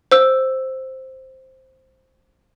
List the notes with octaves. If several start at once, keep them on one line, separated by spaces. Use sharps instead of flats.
C5 E6